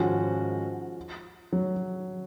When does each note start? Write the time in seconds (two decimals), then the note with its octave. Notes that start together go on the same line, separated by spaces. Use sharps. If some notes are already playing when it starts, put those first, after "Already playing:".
Already playing: G#2 D#3 F3 G#3 C#4 F#4
1.53 F#3